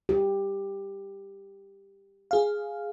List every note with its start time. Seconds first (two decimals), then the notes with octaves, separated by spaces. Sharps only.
0.09 G4
2.31 G#4 F5